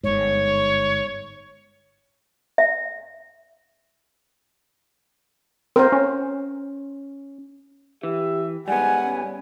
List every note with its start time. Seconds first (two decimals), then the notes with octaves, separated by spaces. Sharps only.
0.03 G1 G#2 C#5
2.58 E5
5.76 C4 A#4 C5
5.92 C#4
8.03 E3 G4 E5
8.68 G#2 G3 B3 F#5 G#5
9.05 C#4